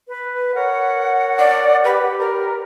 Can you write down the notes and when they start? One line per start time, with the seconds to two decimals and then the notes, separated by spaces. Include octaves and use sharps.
0.08 B4
0.55 A#4 C#5 F#5
1.39 D5
1.84 G4 B4
2.19 A#4